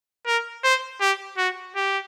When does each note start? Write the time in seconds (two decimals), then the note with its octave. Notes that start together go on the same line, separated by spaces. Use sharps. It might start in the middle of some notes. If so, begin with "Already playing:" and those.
0.26 A#4
0.64 C5
1.01 G4
1.37 F#4
1.76 G4